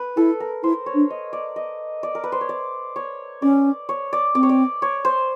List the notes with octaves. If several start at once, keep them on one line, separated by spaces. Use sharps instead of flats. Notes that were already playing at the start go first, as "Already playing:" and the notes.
Already playing: B4
E4 A4
A#4
E4 C5
C#5
D4
D#5
D5
D#5
D5
A#4
B4
C5
C#5
D5
C#5
C#4 D5
C#5
D5
C4 D5
C#5
D5
C#5
C5